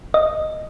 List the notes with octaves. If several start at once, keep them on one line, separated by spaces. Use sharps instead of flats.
D#5